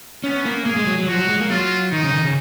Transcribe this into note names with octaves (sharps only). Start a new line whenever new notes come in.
B3 C#4
A#3
A#3 G#4
G#3
F#3
F#3
F3 F#4
F#3
G#3
A#3
F#3 F4
D#3 D#4
C#3
D#3
C#3